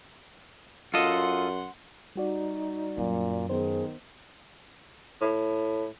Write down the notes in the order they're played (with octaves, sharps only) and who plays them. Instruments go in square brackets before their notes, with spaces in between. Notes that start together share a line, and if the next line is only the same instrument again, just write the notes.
[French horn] F#2 [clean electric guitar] F4 A4 D#5 [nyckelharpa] F#5 C6
[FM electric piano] G3 F#4 D5 [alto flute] D#4
[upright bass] F#2 [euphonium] A#2
[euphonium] D#3 [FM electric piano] B3 C5 [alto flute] G#4
[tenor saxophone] A2